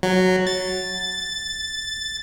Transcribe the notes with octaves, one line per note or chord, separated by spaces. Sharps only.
F#3
A6